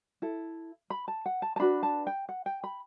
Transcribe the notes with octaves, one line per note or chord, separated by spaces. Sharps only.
E4 A4
B5
A5
F#5
A5
A5
D4 F#4 B4 B5
A5
G5
F#5
G5
B5